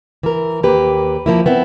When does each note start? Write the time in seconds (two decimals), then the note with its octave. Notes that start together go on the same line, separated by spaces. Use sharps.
0.23 E3 A#4
0.63 D#2 A#3 G4 B4
1.26 F3 A#3 E4
1.46 B3 C4 E4